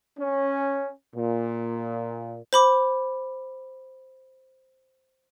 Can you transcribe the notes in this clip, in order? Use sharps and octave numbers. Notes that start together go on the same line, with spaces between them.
C#4
A#2
C5 B5 D6